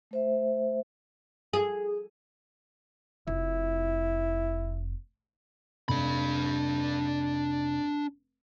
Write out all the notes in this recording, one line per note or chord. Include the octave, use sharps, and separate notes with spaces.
A3 C5 E5
G#4
F1 E4
F1 D4 B5